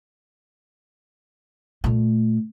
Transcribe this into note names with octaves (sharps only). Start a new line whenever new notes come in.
A#2 A3